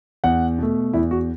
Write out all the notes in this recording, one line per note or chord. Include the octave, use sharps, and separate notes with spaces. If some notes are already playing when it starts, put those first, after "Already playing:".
E2 F#5
B2 A3
E2 E4
F#4